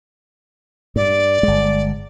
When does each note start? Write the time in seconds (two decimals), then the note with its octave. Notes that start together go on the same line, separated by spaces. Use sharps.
0.96 G2 D5
1.43 G1 G#3